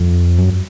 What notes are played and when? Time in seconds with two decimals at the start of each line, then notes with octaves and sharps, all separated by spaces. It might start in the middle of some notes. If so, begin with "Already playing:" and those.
Already playing: F2
0.38 F#2